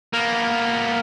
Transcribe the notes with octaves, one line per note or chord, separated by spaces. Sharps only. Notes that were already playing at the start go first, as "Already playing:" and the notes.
A#3 B3